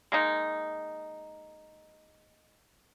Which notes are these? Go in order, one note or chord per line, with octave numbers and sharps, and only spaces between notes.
G#3 A#3 D#4